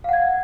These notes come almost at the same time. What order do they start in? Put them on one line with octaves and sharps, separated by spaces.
F5 F#5 G#6